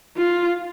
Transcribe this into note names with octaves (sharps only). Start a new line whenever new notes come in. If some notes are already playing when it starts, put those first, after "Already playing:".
F4